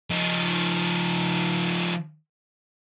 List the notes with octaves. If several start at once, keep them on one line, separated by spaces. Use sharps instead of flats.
F3 D#4